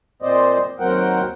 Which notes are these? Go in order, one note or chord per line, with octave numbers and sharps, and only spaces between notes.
A#2 C4 C5 D5 D#5
D#2 F#3 C4 A#4 F#5 G5